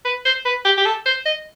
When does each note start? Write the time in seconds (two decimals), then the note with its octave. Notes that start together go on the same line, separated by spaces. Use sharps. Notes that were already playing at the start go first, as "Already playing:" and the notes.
0.05 B4
0.25 C5
0.46 B4
0.65 G4
0.78 G4
0.86 A4
1.06 C5
1.26 D#5